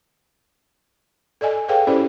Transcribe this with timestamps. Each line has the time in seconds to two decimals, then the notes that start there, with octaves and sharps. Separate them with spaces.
1.41 A4 D5 D#5 G#5
1.68 G#4 A4 B4 C#5 F5 G5
1.87 C#4 E4 G4 A4 C5 D5